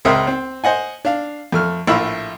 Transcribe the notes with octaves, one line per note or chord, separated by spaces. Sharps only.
C#2 G#3 C4 A#4 E5 D#6
C4
C5 D#5 F#5 G#5
D4 F5
F2 A3 F6
A#1 A2 F4 E5 B5 E6